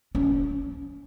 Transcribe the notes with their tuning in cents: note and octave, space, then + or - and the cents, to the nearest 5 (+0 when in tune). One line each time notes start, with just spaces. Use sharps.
C#4 +25